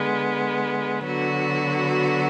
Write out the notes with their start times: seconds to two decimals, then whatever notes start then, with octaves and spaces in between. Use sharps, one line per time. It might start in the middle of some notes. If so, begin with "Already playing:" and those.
Already playing: D3 G#3 B3
1.05 D3 F#3 B3 F#4